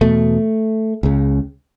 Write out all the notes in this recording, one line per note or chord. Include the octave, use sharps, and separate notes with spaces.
E2 B2 A3
C#2 C#3